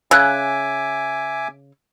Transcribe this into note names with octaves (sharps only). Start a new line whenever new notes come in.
C#3 E5 G#5 D6 E6 F#6 G#6